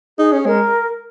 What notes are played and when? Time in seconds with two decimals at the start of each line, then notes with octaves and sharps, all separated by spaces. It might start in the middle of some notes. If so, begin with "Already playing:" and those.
0.18 D#4 G#4
0.33 C#4
0.46 G#3 A#4